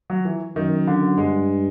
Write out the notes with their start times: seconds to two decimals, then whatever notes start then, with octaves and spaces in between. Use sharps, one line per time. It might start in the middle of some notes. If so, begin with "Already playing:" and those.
0.10 F#3
0.25 E3
0.56 F#2 D#3
0.87 D3
1.18 G2 G#3